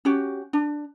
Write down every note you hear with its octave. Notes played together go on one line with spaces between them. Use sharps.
C#4 F#4 G4
D4